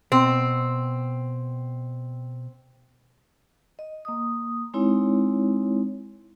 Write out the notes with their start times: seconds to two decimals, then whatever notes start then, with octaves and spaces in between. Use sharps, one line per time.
0.12 B2 C4
3.79 D#5
4.05 A#3 D#6
4.74 G#3 C4 D#4 E4 C#5